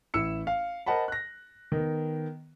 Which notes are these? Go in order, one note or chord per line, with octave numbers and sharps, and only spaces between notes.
A1 E4 E6 C#7
F5
A#4 C5 D#5 F#5 A5 B5
F#6 A#6
D#3 B3